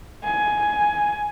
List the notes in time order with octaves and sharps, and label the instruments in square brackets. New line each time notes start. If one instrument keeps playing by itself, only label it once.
[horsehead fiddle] G#5